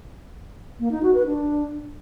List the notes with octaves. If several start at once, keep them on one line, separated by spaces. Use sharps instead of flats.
A#3
D#4
F#4
B4
D4